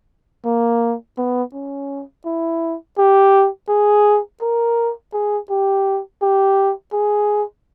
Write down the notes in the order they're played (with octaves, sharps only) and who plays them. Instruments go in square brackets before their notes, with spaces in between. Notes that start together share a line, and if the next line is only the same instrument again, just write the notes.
[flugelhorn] A#3
B3
C#4
E4
G4
G#4
A#4
G#4
G4
G4
G#4